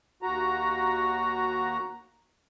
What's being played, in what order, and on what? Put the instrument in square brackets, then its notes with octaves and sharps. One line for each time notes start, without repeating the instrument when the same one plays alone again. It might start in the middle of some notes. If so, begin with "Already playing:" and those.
[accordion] D#2 F#4 A#5